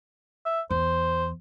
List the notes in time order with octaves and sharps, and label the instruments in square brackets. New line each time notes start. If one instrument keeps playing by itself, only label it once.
[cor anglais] E5
[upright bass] E2 [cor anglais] C5